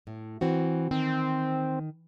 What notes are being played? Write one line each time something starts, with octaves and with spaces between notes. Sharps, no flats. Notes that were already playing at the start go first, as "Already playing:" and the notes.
A2
E3 C4 F#4
D#3 C4